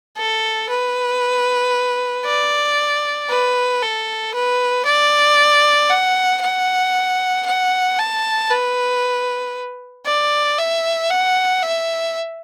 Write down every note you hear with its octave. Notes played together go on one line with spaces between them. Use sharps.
A4
B4
D5
B4
A4
B4
D5
F#5
F#5
F#5
A5
B4
D5
E5
F#5
E5